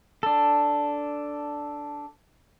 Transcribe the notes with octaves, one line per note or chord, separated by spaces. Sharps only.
D4 A4